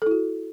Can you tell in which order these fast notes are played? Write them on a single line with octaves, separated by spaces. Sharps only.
A4 E4 F#4